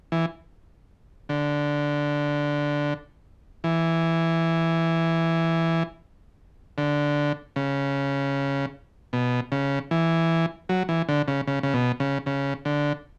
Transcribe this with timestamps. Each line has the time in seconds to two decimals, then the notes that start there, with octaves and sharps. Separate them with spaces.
0.12 E3
1.29 D3
3.64 E3
6.78 D3
7.56 C#3
9.13 B2
9.52 C#3
9.91 E3
10.69 F#3
10.89 E3
11.08 D3
11.28 C#3
11.47 C#3
11.63 C#3
11.74 B2
12.00 C#3
12.26 C#3
12.65 D3